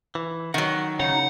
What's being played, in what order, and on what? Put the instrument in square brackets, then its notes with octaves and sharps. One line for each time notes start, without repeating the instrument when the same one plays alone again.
[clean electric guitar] E3
[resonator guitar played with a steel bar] D#3 F#3 [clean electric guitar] F#5
[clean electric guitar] C#3 [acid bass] D#4 [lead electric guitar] F#5